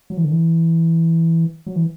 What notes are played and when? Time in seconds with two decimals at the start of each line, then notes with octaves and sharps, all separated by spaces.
0.10 F#3
0.17 E3
0.24 D3
0.31 E3
1.66 F#3
1.76 E3